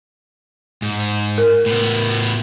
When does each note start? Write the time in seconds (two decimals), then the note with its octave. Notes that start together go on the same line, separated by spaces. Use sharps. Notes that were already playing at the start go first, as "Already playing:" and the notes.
0.82 G#2
1.38 A#4
1.66 A2 B3